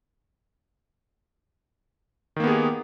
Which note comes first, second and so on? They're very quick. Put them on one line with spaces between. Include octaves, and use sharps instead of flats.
D#3 A#3 B3 G#4 G4